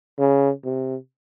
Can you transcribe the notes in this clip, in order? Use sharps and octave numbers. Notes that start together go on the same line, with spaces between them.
C#3
C3